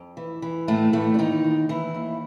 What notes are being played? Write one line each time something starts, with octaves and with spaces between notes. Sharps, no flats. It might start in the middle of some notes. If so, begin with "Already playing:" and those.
Already playing: F2
E3
E3
D#2 A2 A3
A2 E3 A3
D4
D#2 D#3 D#4
D#2
D#2 E3 E4
D#2